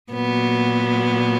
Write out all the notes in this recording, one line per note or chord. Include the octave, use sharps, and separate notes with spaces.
A#2 F#3 B3